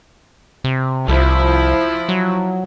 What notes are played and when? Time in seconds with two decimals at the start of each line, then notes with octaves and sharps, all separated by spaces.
0.64 C3
1.08 C2 F3 E4
2.09 F#3